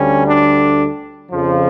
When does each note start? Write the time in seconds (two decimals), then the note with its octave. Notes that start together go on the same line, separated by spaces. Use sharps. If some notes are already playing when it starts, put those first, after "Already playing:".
Already playing: D2 D3 G3 C#4
0.27 D4
1.31 F2 C#3 F3